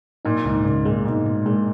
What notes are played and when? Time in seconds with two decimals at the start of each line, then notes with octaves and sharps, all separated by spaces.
0.25 A#2 D#4
0.45 C#2 G#2
0.65 A#2 C#3
0.85 A#2 G#3
1.06 G#2 B2
1.26 B2
1.46 A#2 G#3